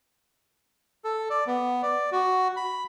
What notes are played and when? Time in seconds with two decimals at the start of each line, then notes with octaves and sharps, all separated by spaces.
1.04 A4
1.30 D5
1.47 B3
1.83 D5
2.12 F#4
2.56 B5